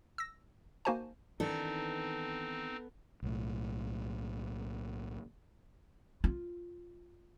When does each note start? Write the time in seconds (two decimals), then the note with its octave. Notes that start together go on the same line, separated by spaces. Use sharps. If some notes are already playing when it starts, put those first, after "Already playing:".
0.18 E6 A#6
0.85 A#3 D#4 F#4 C5 G#5 A5
1.40 D#3 E3 B3 C4 D4 D#4 A4
3.23 B1 A2
6.24 F4